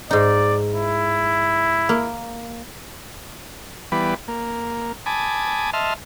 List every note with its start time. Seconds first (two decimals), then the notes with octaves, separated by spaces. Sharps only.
0.11 G#2 D#4 D5
0.74 E4
1.89 A#3
3.92 E3 G3 B3 B4 D5
4.28 A#3
5.06 G#5 A5 B5 D6 D#6
5.73 D#5 E5 A5 C6 F6